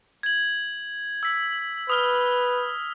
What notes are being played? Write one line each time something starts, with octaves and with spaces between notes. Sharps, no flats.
G#6 F#7
E6 B6
B4 D#6 F6 G7